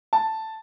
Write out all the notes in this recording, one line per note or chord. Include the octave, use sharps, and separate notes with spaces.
A5